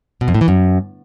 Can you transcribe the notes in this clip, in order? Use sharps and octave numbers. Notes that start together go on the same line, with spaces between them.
B2
F2
A2
E3
F#2